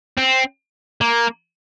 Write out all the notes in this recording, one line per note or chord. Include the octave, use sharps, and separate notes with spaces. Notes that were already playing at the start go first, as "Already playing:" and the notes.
C4
A#3